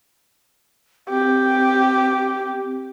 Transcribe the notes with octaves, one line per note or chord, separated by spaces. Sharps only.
C4 G4